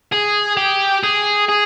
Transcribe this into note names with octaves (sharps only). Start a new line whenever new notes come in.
G#4
G4
G#4
G#4